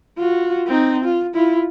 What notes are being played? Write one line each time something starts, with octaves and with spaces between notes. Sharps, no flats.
F4 F#4
C4 D#4
F4
E4 F4